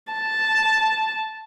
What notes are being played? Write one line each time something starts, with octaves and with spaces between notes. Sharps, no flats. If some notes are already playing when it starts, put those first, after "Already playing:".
A5